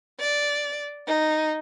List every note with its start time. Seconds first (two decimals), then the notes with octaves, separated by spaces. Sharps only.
0.20 D5
1.07 D#4